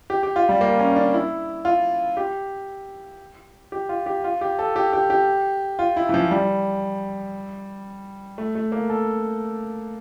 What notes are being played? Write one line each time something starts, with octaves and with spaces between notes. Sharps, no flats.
G4
G4
F4
G3
A#3
C#4
D4
E4
F4
G4
G4
F4
G4
F4
G4
A4
G4
G4
G4
F4
E4
E3
F3
G3
A3
A3
A#3
A4